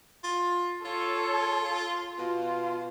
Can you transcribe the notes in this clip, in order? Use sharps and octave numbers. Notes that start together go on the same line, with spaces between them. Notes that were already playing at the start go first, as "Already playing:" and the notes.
F4
F4 A4 C#5
B2 F4